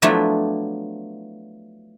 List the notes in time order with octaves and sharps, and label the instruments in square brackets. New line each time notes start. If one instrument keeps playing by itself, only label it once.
[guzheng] F3 F#3 A3 B3 D4 E4